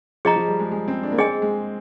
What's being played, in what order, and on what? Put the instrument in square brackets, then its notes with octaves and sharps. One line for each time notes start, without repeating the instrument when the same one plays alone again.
[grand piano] F3 [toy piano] G#4 D#5 A#5
[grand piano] F3
G3
G#3
G#3
C4
D4
A#3
[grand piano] C4 [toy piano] G#4 D#5 G#5
[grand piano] G#3